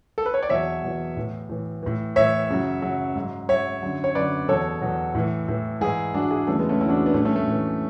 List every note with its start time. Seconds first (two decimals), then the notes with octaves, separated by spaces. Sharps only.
0.18 A4
0.26 B4
0.34 C#5
0.43 D5
0.49 E2 B2 F#3 C#5 E5
0.83 E2 B2 F#3
1.16 A2 E3
1.49 A2 E3
1.83 A2 E3
2.16 A2 E3 C#5 E5
2.50 F#2 C#3 F#3
2.82 F#2 C#3 F#3
3.16 G#2 F#3
3.49 G#2 F#3 C#5 E5
3.82 F#2 D3 F#3
4.04 C#5
4.15 F#2 D3 F#3 B4 D5
4.48 E2 B2 F#3 A4 C#5
4.82 E2 B2 F#3
5.15 A2 E3
5.48 A2 E3
5.81 G#2 E3 E4 G#4
6.14 G#2 E3 D4 F#4
6.31 E4 G#4
6.47 E2 C#3 E3 A3 C#4
6.59 G#3 B3
6.69 A3 C#4
6.81 E2 C#3 E3 C#4 E4
6.89 D4 F#4
7.06 B3 D4
7.14 A2 A3 C#4
7.18 E3
7.25 A3 C#4
7.36 A3
7.47 A2 E3